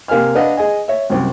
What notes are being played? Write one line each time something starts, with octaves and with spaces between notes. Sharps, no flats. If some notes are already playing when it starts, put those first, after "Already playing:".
C3 A#3 F5 G#5 F6
D4 B4 D#5 F5 F#5
G#4 D#5 G#5
C#5 E5
C2 F#2